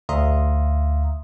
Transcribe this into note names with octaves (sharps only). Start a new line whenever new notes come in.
D2 E5 F5 A#5 C6 D#6